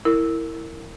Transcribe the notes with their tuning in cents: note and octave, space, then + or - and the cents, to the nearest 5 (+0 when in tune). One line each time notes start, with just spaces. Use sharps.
E4 +0 A#4 -25